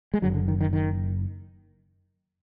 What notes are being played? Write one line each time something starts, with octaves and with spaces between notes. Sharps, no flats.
G#3
F#1 F#2 D3 F#3
D3
D#3
D#3
D#3